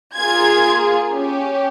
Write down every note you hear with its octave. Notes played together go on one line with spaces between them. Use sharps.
A#3 F4 G#4 G#6
C#4 G4